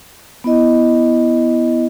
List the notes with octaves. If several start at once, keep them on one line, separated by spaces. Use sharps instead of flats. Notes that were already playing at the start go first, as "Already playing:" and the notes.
B3 E4 D#5